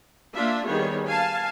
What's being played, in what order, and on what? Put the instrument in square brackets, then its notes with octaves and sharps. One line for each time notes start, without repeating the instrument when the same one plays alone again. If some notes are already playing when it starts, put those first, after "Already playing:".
[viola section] A#3 D4 F4 E5
D#3 G3 B3 G#4 C#5
F5 G#5 A5